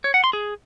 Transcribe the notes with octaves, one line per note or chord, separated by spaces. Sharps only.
C#5
F#5
C6
G#4